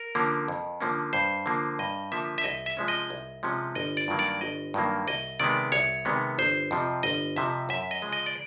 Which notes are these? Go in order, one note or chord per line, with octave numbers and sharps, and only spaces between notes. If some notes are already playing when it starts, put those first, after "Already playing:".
Already playing: A#4
D3 F3 A#3 C#4
F2
D3 F3 A#3 C#4
G2 C5
D3 F3 A#3
G2 D#5
D3 F3 A#3 E5
E5
C2 D#5
E5
C3 F3 G#3 C#4
D#5
C2
C3 F3 G#3 C#4
G1 D#5
D5
G2 D#3 F#3 A#3
D5
G1 D#5
G2 D#3 F#3 A#3
C2 D#5
C3 D#3 G#3 B3 D5
C2 C#5
C3 D#3 G#3 B3
G1 C5
F2 C3 F3
G1 D#5
F2 C3 F3 E5
F#2 E5
D#5
C#3 F3 G#3
D#5
D5